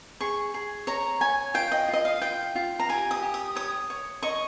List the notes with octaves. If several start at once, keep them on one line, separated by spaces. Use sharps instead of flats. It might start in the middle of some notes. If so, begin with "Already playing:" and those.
G#4 C#6
G#4
C#5 A#5
C#5 G#5
F4 G5
D#5
F4
D#5
F5
F4 G5
F4
A#5
G4 G#5
D#6
G4
D#6
C#5 D#6
C#5
D#5 C#6